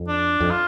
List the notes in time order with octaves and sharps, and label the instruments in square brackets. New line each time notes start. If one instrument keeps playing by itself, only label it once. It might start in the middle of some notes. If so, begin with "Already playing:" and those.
Already playing: [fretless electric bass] F2
[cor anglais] D4
[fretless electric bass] F2
[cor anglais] F4